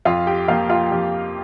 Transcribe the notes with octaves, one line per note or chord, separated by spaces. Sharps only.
F2 F4 F5
G4 G5
F3 A#3 F4 F5
F4 F5
F2 G4